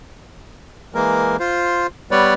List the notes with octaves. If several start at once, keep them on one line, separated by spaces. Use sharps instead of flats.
E3 G#3 A#3 A#4
F4 C5
G3 B3 B4 C#5 D5